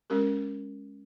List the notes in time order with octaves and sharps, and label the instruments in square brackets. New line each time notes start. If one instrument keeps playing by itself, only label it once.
[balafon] G#3 C#4 G4 A#4